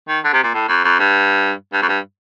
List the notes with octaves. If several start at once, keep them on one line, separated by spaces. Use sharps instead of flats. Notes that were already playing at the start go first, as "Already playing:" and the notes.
D#3
D3
C3
A#2
A2
F2
F2
G2
G2
F2
G2